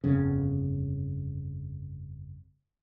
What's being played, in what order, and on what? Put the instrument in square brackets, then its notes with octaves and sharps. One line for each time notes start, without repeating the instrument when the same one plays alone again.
[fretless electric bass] G1 F2 C#3